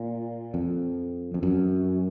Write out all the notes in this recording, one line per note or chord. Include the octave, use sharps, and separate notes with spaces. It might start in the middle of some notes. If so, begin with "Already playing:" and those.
Already playing: A#2
F2
F2
F#2